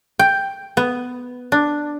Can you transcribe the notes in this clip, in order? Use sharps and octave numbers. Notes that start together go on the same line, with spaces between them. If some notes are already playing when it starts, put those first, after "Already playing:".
G5
B3
D4